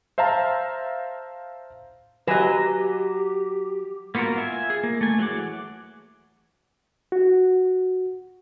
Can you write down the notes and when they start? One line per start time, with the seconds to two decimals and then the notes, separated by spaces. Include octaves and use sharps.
0.18 C5 E5 F5 A5 A#5
2.28 F#3 G4 B4 D#5 G#5
4.15 A#3 B3 F4 F#4 A#4
4.36 F4 E5 G#5
4.70 G#4
4.83 A#3
5.01 A3 G#5
5.18 E3 F#3 G#4 F#5 D6
7.12 F#4